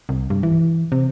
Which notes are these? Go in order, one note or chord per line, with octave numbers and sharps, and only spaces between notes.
C2
G2
E3
C3